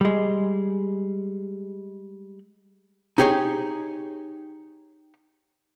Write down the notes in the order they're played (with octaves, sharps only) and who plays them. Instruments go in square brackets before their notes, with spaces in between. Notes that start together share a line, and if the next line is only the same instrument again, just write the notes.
[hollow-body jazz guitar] G3 G#3
D#4 G4 G#4 C#5